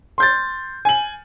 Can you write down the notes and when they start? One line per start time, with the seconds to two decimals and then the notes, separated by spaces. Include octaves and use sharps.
0.18 C6 G6 A6
0.85 G#5 F#7